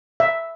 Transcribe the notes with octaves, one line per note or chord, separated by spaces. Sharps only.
E5